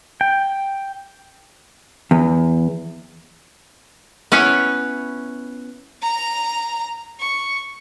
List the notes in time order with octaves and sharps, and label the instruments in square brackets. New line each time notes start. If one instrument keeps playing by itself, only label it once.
[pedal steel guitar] G5
[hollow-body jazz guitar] E2
[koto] B3 C#4 E4 C#5
[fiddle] A#5
C#6